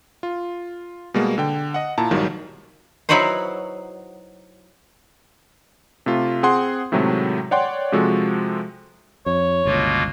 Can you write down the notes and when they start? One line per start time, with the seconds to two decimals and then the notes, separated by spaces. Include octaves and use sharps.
0.23 F4
1.14 B2 G3 G#3 A#3
1.38 D3 G5
1.74 D#5 F#5
1.98 A#2 E4 A5 A#5
2.11 B1 G#2 D#3 F#3 G3
3.09 F#3 D#4 E4 F#4 B4 C5
6.06 C3 A3 F4
6.43 C4 G#4 F#5 C6
6.92 A2 C3 D#3 F#3 G#3 A3
7.51 C#5 D5 F#5 G5 C6
7.92 C3 F3 G#3 F#4 A4
9.26 F2 C#5
9.65 G1 C#2 B2 A#3 F4